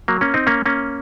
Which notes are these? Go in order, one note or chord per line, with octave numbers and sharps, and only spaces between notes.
F#3 A#3
A#3 C#4
C4 D#4
A#3 C#4
A#3 C#4